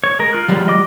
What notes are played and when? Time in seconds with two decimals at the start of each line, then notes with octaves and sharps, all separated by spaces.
0.04 C#5
0.19 G#3 A#4
0.33 F4 F6 F#6
0.48 F3 G3 G#3
0.68 D#5 D6